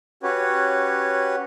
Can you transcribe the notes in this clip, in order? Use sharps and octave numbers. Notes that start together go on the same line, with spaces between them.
C#4 F#4 G4 B4 C#5